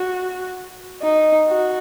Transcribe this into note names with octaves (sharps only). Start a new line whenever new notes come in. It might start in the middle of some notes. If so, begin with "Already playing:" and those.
Already playing: F#4
D#4
F#4